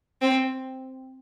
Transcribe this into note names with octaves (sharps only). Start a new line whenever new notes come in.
C4